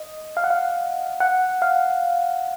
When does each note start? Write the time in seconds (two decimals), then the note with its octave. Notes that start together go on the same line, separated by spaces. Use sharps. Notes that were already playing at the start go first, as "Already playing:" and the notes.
Already playing: D#5
0.37 F5
0.44 F#5
0.50 F5
1.20 F#5
1.62 F5